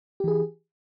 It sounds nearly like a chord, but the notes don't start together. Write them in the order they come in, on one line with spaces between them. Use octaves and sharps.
G4 E3 G#4